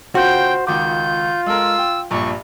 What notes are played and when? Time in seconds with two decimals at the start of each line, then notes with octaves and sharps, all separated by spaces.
0.15 C#3 F4 F#4 C5 G5
0.67 C#2 D#3 F4 D6 G6
1.46 G#3 A4 A#4 E6
1.79 G5
2.11 A#1 G2 A#2 C#6